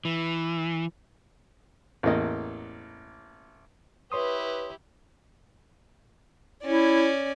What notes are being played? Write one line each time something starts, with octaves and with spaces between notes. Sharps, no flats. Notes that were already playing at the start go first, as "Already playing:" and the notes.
E3
A1 E2 A#3 D#5
E4 G4 B4 C#5 C6 D#6
C#4 E4 D5